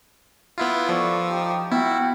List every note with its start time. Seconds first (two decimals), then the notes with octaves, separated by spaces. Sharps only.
0.58 B3 E4 F4
0.89 F3 A4 D5 C#6
1.29 D#4 G4
1.71 B3 E4 F#4 G5